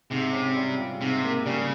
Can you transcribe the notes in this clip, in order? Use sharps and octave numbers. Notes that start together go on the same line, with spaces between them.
G#2 C3
C#4
G3
F4
G#2 C3
A#3
C#3 G3